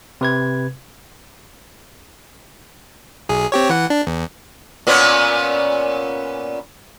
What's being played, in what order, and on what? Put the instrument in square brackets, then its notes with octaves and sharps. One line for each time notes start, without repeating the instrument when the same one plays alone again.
[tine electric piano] C3 B4 G#6
[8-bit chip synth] B1 G#4
C4 G4 C#5
E3 F#5
D4
E2
[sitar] A#2 B3 C#4